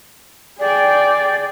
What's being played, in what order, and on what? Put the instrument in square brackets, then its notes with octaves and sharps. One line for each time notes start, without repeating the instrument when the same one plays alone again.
[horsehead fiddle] G#4 G5 [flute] D5